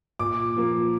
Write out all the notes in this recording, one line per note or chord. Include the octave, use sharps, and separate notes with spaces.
A#2 D6
F3 A#3